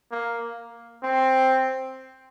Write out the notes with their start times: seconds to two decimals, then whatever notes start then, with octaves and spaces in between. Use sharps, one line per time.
0.12 A#3
1.03 C4